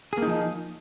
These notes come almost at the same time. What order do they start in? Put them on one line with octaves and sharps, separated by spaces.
G#4 A#3 D#4 F3